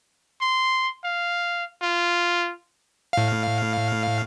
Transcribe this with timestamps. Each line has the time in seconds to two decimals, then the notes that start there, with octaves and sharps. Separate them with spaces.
0.41 C6
1.04 F5
1.82 F4
3.13 A2 F5